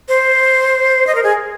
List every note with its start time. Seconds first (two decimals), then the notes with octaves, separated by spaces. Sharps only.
0.09 C5
1.07 D#5
1.15 A#4
1.23 G#4